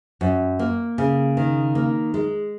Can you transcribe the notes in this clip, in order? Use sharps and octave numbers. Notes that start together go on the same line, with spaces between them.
F#2
A#3
C#3
D#3
A#3
G#3